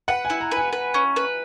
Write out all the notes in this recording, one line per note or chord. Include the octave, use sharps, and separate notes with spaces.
B4 F#5
G#5
E4
A#5
B4
G#5
B4
C#4
B4